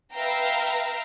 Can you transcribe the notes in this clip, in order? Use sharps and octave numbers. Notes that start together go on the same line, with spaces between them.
B4 E5 F5 G5 A#5